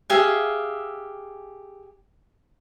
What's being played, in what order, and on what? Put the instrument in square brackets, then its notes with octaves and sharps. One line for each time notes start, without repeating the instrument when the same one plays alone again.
[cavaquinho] G4 G#4 E5 F5